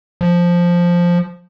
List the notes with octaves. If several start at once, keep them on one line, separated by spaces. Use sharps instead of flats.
F3